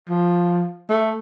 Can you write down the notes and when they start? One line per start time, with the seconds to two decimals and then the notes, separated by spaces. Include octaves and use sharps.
0.09 F3
0.90 A3